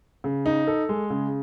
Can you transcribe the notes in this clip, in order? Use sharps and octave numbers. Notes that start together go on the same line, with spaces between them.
C#3
D#4
A4
G#3
C#3